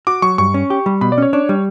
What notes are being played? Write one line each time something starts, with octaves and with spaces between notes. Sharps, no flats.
F#4 D6
F#3 C#6
G2 C#6
C#4
G4
G3
B2 B5
D5
C#4 C#5
D4 C#5
G3